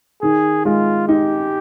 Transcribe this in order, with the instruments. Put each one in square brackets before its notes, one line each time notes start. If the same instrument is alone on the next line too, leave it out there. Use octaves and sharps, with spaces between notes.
[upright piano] D#3 [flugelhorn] G#4
[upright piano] G#3 [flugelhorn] F4
[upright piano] D#4 [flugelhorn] G4